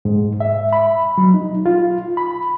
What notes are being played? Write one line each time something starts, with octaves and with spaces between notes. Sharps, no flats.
G#2
E5
B5
F#3
D#4
F4
B5